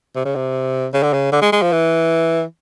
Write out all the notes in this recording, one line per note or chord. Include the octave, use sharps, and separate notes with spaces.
C3
C#3
C3
C#3
D3
C#3
D3
G#3
G#3
F3
E3